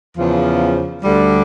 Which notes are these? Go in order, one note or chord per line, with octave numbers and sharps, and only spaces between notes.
E2 C#3 F3
D2 D3 G3